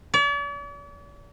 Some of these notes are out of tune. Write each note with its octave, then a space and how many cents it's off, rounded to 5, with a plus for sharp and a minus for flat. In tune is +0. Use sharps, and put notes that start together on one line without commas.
D5 -45